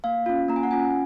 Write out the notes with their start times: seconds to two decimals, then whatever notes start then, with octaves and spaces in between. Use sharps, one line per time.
0.04 A#3 F5
0.26 C#4 F4
0.48 A#3 A#5
0.56 G#5
0.63 F#5
0.71 C#4 F4 G#5